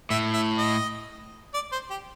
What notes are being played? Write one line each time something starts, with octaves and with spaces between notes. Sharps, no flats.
A2 E5
E5
D#5
D5
C5
G4